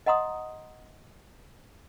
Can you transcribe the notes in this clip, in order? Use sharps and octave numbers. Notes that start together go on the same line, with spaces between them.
D#5 F#5 A#5 C6 D#6